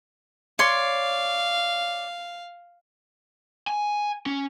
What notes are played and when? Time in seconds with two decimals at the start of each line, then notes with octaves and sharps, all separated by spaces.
0.59 C#5 D5 F5 C6
3.67 G#5
4.26 C#4